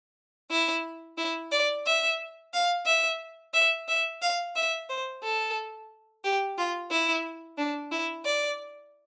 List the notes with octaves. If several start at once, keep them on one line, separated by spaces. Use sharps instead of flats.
E4
E4
D5
E5
F5
E5
E5
E5
F5
E5
C5
A4
G4
F4
E4
D4
E4
D5